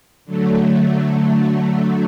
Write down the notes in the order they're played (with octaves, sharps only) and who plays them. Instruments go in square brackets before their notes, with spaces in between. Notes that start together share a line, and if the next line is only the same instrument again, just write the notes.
[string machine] D3 F#3 A3